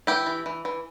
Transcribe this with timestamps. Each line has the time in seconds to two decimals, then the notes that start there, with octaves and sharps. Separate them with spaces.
0.07 E3 E4 G4
0.26 E3
0.46 E3
0.65 E3